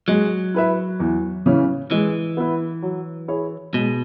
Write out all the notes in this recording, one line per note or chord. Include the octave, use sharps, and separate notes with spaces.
F#3 G#3
E4 B4 E5
E2
C#3 E3 C#4
E3 G#3
B3 E4
F#3
E4 G#4 C#5
B2 G#3